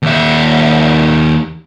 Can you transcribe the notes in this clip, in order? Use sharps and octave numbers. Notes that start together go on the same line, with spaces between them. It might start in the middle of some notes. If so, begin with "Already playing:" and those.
D#2 E5